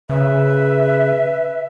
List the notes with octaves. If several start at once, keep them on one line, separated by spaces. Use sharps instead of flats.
C#3 B4 E5